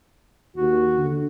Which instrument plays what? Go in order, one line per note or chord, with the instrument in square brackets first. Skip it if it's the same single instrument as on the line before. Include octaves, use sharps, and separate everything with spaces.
[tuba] D#2 [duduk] F#4
[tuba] D3